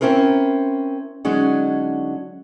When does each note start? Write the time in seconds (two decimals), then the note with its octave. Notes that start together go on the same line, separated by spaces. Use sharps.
0.01 C4 C#4 E4 A#4 C5
1.25 D3 F#3 G#3 C#4 D#4